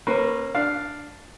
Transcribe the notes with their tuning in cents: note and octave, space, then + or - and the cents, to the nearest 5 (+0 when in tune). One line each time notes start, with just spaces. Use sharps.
A#3 +0 C#4 -35 B4 +0
D4 +0 F5 +0